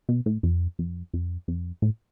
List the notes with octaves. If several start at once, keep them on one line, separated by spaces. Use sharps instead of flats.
B2
A2
F2
F2
F2
F2
A2